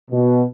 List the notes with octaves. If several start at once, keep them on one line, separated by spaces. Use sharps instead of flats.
B2